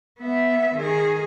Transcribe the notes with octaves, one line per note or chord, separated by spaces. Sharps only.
B3 E5
D#3 G#4